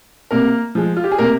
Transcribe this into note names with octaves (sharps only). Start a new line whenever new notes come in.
C3 A#3 A#4
F3 G#3
F4
G4
G#4
C3 A#3 A#4